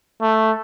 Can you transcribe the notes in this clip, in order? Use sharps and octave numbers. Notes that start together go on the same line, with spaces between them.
A3